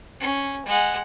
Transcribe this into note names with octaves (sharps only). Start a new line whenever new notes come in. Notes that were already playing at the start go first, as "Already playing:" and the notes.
C#4
G#3 F#5